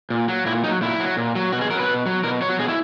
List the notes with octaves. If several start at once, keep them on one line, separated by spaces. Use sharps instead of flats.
A#2
F#3
A#2 E4
F#3 D#4
A#2 E4
F#3
A#2
F#3
B2 F#4
G#4
F#3 A#4
B4
B2
F#3
B2 A#4
F#3 C#5
B2 G#4
E4